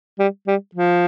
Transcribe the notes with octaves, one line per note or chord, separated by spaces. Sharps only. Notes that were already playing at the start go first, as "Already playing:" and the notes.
G3
G3
F3